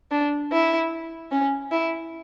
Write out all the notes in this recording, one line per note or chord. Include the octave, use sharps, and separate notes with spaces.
D4
E4
C#4
E4